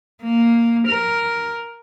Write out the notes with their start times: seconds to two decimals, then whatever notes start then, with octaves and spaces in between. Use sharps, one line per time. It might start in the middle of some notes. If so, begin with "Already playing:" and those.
0.23 A#3
0.88 A#4